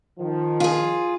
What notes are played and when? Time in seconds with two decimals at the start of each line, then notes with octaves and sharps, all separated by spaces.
0.20 D#3 F3
0.60 F4 G#4